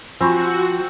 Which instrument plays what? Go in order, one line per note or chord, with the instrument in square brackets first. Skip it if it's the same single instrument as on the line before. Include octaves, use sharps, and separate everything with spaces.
[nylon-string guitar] F3 [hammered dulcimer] C4 [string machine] F#4 [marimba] G#5 B5 C#6